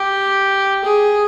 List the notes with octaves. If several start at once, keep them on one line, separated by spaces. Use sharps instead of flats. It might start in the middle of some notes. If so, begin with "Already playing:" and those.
Already playing: G4
G#4